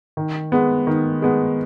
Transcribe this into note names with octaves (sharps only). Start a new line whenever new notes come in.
D#3
G#3 B3
D#3
G#3 B3